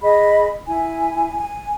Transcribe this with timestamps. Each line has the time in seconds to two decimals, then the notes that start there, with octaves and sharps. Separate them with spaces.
0.02 G#4 D#5 B5
0.68 E4 G#5
1.39 G#5